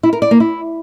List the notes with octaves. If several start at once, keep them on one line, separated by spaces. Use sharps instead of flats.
E4
A#4
D5
A#3
E4